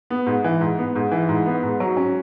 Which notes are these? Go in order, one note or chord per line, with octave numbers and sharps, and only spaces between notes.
B3
G#2
E3
G#2
B3
G#2
E3
G#2
B3
G#2
F#3
C#4